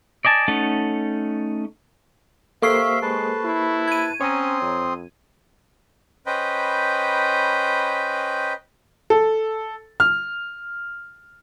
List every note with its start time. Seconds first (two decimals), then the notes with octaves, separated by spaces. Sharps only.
0.25 D5 D#5 G#5 A5
0.48 A3 C#4 D#4 A4 F#5
2.62 A#3 G4 A4 C5 E5 F5 C#6 C7
3.02 G#3 B4 A5
3.45 E4
3.88 G#6 D#7
4.21 C4 C#4 C#5 A#5 C6 D#6
4.62 F2
6.26 C#4 B4 C5 D#5 G5 B5
9.10 A4
10.00 F6